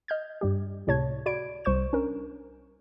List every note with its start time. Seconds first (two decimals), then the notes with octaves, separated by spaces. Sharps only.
0.08 D#5 F6 G6 G#6
0.41 G2 G3 G4
0.87 C#2 A2 C3 C#5 A5 G#6
1.26 F#4 D5 B5 G#6 D7
1.65 C2 C5 C#6 G6 E7
1.93 C#4 D4 A#4